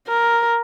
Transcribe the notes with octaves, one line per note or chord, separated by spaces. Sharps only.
A#4